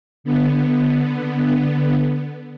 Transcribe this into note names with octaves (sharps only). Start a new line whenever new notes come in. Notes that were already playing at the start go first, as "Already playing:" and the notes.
D3 B3